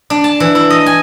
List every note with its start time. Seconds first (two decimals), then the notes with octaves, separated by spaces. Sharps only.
0.10 D4
0.24 A5
0.40 E3
0.55 E4
0.70 D#5
0.86 G#5